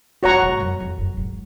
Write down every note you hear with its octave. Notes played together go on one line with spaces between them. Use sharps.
F#2 F#4 C#5 F#5 A#5 C#6
G#2
F#2
F2
F#2
G#2